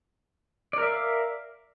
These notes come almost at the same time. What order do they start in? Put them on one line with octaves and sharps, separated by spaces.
D5 A#4 E5 F5